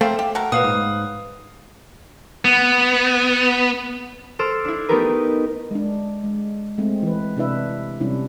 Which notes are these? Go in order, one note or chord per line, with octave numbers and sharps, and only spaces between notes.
A3 A#3 C4 F5
G4
F#4 A4 A#4
A#2 F#3 B4 F5 D#6
G#2
B3
A4 C5 D6 E6 F6
D4 E4
A3 B3 D#4 G4 A#4 B4
G#3 D4
G#3
G#3 A3 C4
E3 B4
C3 D4 E4 B4 E5
C3 G3 C#4 D4 E4